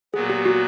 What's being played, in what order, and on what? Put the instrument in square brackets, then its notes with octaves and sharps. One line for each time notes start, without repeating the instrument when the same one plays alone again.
[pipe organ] A#2 F#3 B3 [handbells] G#4
[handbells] G4
F#4